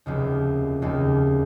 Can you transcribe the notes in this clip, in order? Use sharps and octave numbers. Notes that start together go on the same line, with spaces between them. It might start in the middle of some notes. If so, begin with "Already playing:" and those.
F1 D#2 C#3
F1 D#2 C#3